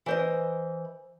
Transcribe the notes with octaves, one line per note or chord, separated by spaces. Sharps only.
E3 C5 D#5